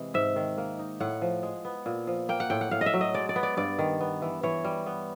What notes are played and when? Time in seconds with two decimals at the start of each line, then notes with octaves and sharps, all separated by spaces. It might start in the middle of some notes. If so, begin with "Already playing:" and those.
Already playing: C3 E3 G#3
0.14 G#2 E5
0.36 D#3
0.58 A#3
0.79 D#4
1.00 A2 F#5
1.22 F3
1.43 G#3
1.65 B3
1.86 A#2
2.07 F3
2.29 A#3 G5
2.40 F#5
2.50 A2 G5
2.61 F#5
2.71 A2 F5
2.81 D#5
2.86 E5
2.93 F#3
3.01 D#5
3.14 G#3 D5
3.29 D5
3.36 B3
3.43 D5
3.57 G2 D5
3.78 D#3
4.00 B3
4.22 E3
4.43 E3 C#5
4.64 G3
4.86 B3